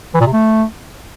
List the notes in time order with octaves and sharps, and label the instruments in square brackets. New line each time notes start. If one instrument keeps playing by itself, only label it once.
[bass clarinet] E3
A#2
C3
A3